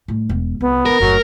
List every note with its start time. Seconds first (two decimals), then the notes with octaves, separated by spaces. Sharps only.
0.08 A2 G3
0.29 E1
0.61 C2 B3
0.86 D#3 F#3 A#4
1.00 F#1 A2 F#3